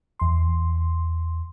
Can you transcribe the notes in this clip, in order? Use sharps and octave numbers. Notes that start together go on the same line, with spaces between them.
E2 C6